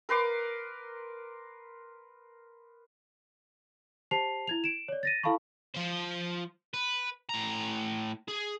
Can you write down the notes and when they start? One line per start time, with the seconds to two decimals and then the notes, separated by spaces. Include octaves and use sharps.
0.09 A#4 B4 C6 D6
4.11 G4 C5 A5 C7 F7
4.47 E4 G#6 F7
4.64 D7 E7
4.88 C#5 D5
5.03 A6 A#6 D#7
5.23 E4 A4 F5 A5 B5 C#6
5.74 F3 C5
6.74 B4
7.29 A2 A#5
8.28 G#4